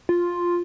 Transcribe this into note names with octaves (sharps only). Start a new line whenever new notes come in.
F4